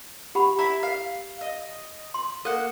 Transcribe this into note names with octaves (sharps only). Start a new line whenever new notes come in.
G4 F#5 B5
E4 A#5 B5
F5
D#5
C6
A#3 A4 F#5